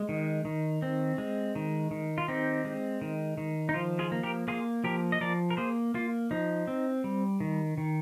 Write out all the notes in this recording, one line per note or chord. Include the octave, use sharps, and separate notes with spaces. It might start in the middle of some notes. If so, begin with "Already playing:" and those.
Already playing: G#3
D#3
D#3
C4
G#3
D#3
D#3
F4
C4 D#4 G4
G#3
D#3
D#3
D#4
F3 F4
F4 G#4
A#3
G4 A#4
A#3 F4 G#4
F3 G4 A#4
D#5
F3 A#4 D5
A#4
A#3 G#4 C5
A#3 F4
F3 D#4
C4
G3
D#3
D#3